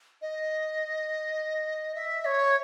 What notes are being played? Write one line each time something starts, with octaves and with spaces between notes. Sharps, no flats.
D#5
E5
C#5